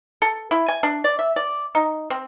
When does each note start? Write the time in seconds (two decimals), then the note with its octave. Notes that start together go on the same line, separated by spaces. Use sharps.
0.22 A4
0.51 E4
0.68 G#5
0.83 D4
1.04 D5
1.19 E5
1.36 D5
1.75 D#4
2.10 C4